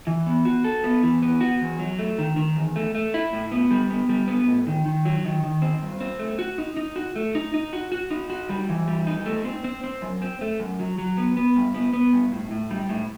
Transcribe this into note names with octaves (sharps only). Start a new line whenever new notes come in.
E3
B3
F#4
A4
B3
E3
B3
F#4
E2
F#3
A3
D#3
D#3
E2
A3
A3
E4
A2
B3
G3
B3
G3
B3
A2
D#3
D#3
F#3
D#3
D#3
C4
G2
C4
A3
F#4
D#4
D#4
F#4
A3
D#4
D#4
F#4
F#4
D#4
F#4
G3
E3
G3
D#4
A3
C4
C4
C4
F#2
C4
A3
F#2
F#3
F#3
B3
B3
G2
B3
B3
G2
A2
A2
G3
A2